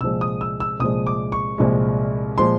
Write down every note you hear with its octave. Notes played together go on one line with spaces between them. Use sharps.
C2 A#2 F3 G#3 E6
D#6
E6
E6
C2 A#2 F3 G#3 D#6
D6
C#6
C2 A#2 F3 G#3
A#2 F3 G#3 C6